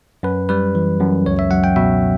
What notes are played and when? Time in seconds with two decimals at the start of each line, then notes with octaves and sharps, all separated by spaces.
0.23 F#2 B4
0.49 G3 B4
0.75 E3
1.00 F#2
1.26 C#2 C#5
1.39 E5
1.51 F#3 F#5
1.64 G5
1.76 B2 E5